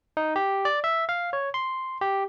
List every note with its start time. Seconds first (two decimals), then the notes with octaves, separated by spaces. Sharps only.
0.17 D#4
0.36 G4
0.65 D5
0.84 E5
1.09 F5
1.33 C#5
1.54 C6
2.01 G4